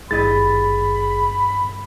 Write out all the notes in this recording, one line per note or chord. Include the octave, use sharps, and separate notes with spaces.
G#1 G2 E4 G#4 D#5 B5 A6